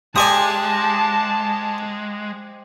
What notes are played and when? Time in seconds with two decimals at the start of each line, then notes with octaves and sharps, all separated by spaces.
0.16 G#3 G4 C5 D5 F5 G#5 A5 D#6